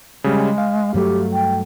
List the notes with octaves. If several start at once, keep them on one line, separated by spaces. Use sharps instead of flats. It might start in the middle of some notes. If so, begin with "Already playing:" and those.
C#3 G3 G#3
F5
G2 F#3 A3 G4
G5